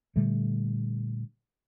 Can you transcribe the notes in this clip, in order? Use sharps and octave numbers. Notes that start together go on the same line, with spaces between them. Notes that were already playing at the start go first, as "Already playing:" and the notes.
A#2 D3 G3 A3